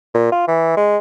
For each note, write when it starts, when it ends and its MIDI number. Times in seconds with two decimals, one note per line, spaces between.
0.15 0.30 46
0.32 0.45 65
0.48 0.75 52
0.77 0.98 56